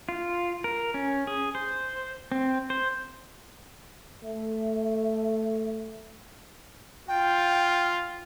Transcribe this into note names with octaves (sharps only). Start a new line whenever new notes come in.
F4
A#4
C#4
G#4
C5
C4
C5
A3 E5
F4 G5